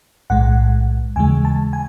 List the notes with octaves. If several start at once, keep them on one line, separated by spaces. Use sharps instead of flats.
B1 A2 G#3 F#5
D#2 C#3 E3 G#3 G#5
A5
G#5